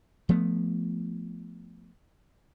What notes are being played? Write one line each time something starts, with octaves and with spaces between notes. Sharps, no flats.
F3 A3 B3